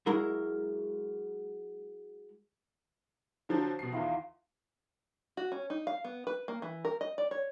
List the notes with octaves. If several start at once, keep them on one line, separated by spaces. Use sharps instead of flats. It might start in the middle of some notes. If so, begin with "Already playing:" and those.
F#3 G#3 E4 A#4
D3 F3 F#3 C5 G5 A5
B2 C7
E2 D#3 B3 E4 F4
F#4
C#4
D#4
F5
B3
B4
A#3
E3
A#4
D#5
D5
C#5